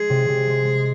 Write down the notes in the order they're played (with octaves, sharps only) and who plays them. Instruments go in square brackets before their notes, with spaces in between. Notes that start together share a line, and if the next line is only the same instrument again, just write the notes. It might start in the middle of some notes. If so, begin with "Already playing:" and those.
Already playing: [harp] G#3 [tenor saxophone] G#4
[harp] C3
C3
G#3
G#3